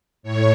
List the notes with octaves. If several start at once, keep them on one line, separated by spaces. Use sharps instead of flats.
A2 C#5